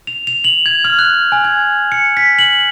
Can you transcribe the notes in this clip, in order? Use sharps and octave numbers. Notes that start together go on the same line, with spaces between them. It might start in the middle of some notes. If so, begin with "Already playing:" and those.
F7
F7
F#7
G#6
F6
F#6
G#5
G#6
C#7
B6
F#7